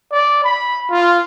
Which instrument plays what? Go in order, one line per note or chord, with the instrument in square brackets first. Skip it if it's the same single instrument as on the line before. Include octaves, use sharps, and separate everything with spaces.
[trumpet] D5
B5
F4